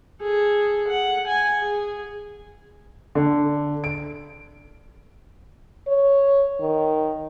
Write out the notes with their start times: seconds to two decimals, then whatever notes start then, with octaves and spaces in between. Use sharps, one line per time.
0.22 G#4 A4
0.88 F#5
1.28 G#5
1.59 G#4
3.15 D3
3.84 D7
5.88 C#5
6.60 D#3